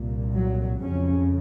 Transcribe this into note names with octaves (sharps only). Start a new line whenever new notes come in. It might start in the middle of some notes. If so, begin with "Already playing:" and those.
Already playing: C2 A#2
F#3
F2 C#3 C#4